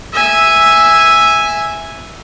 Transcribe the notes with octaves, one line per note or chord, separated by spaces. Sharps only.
E5 G#5